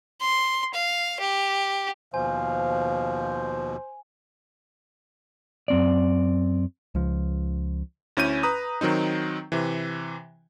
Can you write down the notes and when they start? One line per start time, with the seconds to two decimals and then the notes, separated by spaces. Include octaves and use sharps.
0.21 C6
0.74 F5
1.20 G4
2.14 D#2 B2 F3 C5 F5 G#5
5.68 F#2 C4 D5
6.95 C#2 F3
8.17 D2 C#4 E4 G6 D#7
8.43 B4 A#5 D#6
8.81 D#3 F#3 C4 D#4
9.52 C3 E3